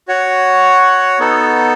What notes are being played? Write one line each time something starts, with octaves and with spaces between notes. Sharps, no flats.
F#4 C#5 F#5
B3 D#4 A4